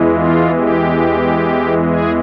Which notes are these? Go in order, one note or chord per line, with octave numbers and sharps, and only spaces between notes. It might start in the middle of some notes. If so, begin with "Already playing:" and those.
Already playing: E2 E3 G#3
F4
G4
G#4